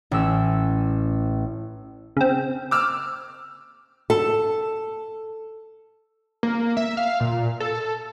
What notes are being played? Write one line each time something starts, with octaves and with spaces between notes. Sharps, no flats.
A1 C#4 E6
C#3 C4
D6 E6 F6
A4
A#3
E5
F5
A#2
A4